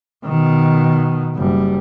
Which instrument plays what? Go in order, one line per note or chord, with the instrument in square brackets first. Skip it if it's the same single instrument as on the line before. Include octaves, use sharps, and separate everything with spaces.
[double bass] B2 D#3
F#1 G3